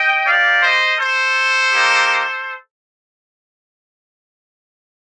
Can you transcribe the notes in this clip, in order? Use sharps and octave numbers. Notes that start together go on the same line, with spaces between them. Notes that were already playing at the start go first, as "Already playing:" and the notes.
Already playing: D#5 G5
A#3 D#4 G4 D5 F5
C5 D#5
A4 C5
A#3 D#4 G4